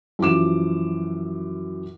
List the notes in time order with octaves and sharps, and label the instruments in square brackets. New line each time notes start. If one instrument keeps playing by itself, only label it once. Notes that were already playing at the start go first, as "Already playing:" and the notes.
[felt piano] F#2 E3 F3 D6 E7